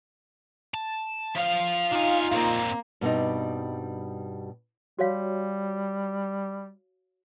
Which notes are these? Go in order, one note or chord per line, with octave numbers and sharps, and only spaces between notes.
A5
F3 F5 F6
D4 D#4 F4 G#5
A#2 A#3 C4
G2 B2 G3 C4 D#4
G3 F#4 C#5 F5